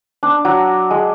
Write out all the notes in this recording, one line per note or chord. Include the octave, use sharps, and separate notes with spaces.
D4
F#3
G#3